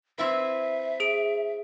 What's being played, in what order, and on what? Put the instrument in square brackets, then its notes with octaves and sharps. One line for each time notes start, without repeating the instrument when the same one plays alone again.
[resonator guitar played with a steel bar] C4 E4 B4 [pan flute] E5
[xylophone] G#4 D7